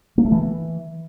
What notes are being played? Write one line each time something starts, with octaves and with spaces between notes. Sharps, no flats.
A#3
A3
E3